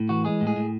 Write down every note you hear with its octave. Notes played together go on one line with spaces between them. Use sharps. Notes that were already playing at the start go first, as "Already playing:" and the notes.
Already playing: A2
E3 F#4
G#3 G#4
A2
G#4
A2